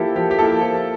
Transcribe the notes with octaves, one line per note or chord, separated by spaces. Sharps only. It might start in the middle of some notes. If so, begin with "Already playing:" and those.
Already playing: F3 A#3 E4 G4 A4
F3 G4
G4
A#3 E4 A4
F3